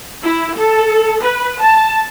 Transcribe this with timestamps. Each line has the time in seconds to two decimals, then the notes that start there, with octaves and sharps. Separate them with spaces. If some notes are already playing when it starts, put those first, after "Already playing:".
0.24 E4
0.57 A4
1.22 B4
1.62 A5